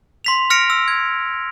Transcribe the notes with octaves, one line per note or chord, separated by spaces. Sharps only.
C6 B6 F7
F6 A#6 C#7 D7 F7
E6
G#6